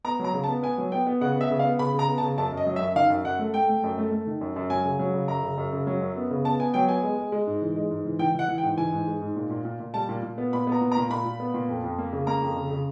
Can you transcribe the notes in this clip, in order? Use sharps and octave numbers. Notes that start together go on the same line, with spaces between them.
B3 A#5
F#3 A#5
C#3
A5
B3
B3 G#5
F#3
B3 G5
B3
C#3 F#5
B3
E5
C#3
F5
B3
C#3 B5
C#3 A#5
B3
A5
C#3
F#2 A5
F#2
D#5
F#3
E5
F#2
D#3 F5
F#2
F#2 F#5
A3
A3 G5
A3
F#2
A3
A3
D#3
F#2
F#2
F#3 G#5
C#3
F#3
C#3
F#2 A#5
C#3
F#2
C#3
F#3
F#2
B3
C#3
B3 A5
B3 G#5
F#3 G5
B3 G#5
G#3
G#3
G#3
G#2
E3
G#3
G#2
E3
E3 G5
E3 F#5
E3
G5
G#2
E3 G#5
G#2
G#3
G#2
A#2
A#2
A#2
A#2
G3 A5
A#2
A#2
B3
A#2 B5
B3 A#5
A#2
A#5
A#2
A#2 B5
A#2
B3
A#2
F2
F2
A#3
C#3
A#3 A#5
F2
C#3
C#3